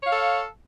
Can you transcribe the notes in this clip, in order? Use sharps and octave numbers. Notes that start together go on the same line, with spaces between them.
A4 C#5 F5